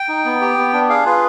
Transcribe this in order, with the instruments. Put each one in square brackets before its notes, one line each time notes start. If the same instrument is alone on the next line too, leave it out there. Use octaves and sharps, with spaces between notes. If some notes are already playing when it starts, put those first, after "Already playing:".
Already playing: [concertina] G5
D#4
B3
G4
B3
D4
G#4 F5
F4 B4